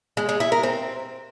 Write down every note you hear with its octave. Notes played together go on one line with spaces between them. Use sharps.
G#3
G#3
E4
A#4
C4